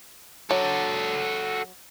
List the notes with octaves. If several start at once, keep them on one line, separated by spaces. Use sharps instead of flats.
F#3 F#4 A4